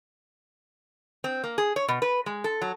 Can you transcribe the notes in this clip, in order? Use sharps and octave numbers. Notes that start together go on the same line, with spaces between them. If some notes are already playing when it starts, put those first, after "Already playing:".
C4
A#3
G#4
C#5
B2
B4
G#3
A4
F#3